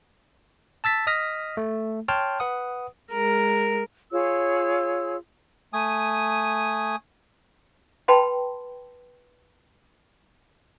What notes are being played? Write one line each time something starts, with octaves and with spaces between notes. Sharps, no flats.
A5 E6 A6 B6
D#5 D#6 F6 A#6 B6
A3
C#5 G5 A5 C6 F6
B4 F#5 D#6
G#3 A#4
F4 G#4 C#5 E6
A3 G#5 D#6
B4 G5 A5 B5 C6